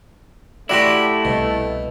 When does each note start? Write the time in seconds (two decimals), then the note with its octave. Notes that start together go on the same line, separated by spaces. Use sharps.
0.69 A3 E4 F#4 G4 D5 G5 C6
1.25 C2 B2